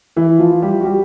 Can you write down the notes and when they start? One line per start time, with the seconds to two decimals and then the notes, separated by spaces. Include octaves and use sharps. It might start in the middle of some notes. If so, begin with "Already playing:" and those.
0.16 E3 E4
0.39 F3 F4
0.62 G3 G4
0.81 F#4
0.85 G3 G4